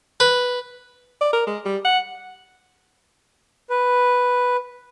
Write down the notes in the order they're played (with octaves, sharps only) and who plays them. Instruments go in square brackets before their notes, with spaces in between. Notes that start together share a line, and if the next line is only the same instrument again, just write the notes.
[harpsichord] B4
[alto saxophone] D5
A#4
G#3
G3
F#5
[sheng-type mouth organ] B4